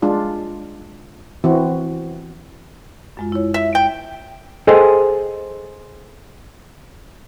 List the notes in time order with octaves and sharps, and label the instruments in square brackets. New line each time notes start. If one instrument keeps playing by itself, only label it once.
[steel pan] G#3 D4 F4
E3 C4 F#4
[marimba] F#2 G#3 F4
E4 C#5
[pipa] E5
G5
[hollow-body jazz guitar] G#4 A4 C5 D#5 G5 G#5